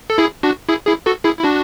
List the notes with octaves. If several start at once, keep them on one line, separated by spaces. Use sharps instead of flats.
A4
E4 G#4
D4 F#4
E4 G#4
E4 G#4
F#4 A4
E4 G#4
E4
D4 F#4